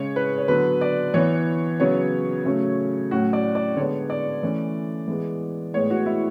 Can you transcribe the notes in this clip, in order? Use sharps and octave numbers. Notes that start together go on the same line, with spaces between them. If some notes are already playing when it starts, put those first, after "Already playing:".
Already playing: C#3 G#3 C#4 C#5
B4
C#5
D3 F#3 B3 B4
D5
E3 B3 C#5
C#3 F#3 B3 C#5
C#3 F#3 A3 C#4
A2 F#3 C#4 F#4
D5
D5
D3 G#3 B3 C#5
D5
E3 A3 C#4
E3 G#3 B3
A2 G#3 B3 C#5
F#4
E4